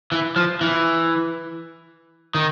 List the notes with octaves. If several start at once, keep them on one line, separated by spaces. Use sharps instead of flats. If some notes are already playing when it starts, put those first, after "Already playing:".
E3
F3
E3
D#3